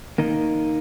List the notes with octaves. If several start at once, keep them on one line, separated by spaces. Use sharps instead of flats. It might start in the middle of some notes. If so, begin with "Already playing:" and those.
D#3 A#3 D#4